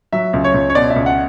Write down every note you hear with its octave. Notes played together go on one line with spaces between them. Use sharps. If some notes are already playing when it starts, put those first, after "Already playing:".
F#3 E5
C#2
C#5
C#2
C#5
B2 D5
E5
C#2
F#5